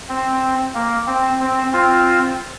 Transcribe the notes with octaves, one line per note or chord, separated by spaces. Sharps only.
C4
A#3
C4
C4
C4 F4